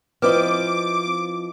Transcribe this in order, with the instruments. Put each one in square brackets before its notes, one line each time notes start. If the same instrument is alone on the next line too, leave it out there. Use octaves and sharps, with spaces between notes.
[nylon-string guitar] F3 E4 D#5 [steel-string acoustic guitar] C4 [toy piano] B4 [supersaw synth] D6